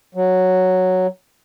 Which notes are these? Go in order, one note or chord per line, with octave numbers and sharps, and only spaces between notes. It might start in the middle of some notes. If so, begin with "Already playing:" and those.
F#3